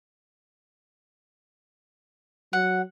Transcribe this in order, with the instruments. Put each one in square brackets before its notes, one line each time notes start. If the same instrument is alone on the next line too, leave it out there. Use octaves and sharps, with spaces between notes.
[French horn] F#3 [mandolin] F#5